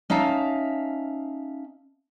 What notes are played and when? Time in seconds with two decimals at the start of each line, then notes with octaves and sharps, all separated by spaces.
0.10 C#4 D#4 E5 F5 A5